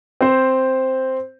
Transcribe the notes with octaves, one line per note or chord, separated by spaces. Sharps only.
C4 C5